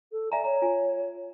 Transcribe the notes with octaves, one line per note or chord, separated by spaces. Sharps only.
A4
D5 E5 G#5 A#5
C#5 A#5
F4 G#5